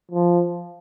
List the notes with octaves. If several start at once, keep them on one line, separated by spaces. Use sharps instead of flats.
F3